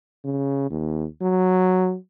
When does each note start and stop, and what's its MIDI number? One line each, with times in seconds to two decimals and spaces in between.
0.24 0.70 49
0.70 1.05 39
1.22 1.95 54